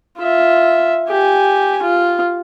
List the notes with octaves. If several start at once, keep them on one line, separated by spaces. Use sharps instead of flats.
F4 E5
G4 G#5
F4